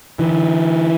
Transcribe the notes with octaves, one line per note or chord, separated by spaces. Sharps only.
D3 E3